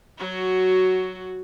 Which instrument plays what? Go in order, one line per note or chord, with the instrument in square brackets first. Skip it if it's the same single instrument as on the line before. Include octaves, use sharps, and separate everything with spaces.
[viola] F#3 F#4